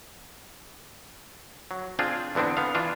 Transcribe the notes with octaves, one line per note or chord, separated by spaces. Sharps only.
F#3
C4 D4 F4 G#4
E2 D3 B3 C4 D4
B3 F5
E3 D4 F4